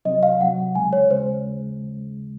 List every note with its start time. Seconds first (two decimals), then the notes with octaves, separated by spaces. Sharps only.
0.05 C3 F#3 C4 D#5
0.23 F5
0.41 C3 F#3 C4 F#5
0.75 D#2 C#3 G#3 G#5
0.93 C#5
1.11 C#3 G#3 C5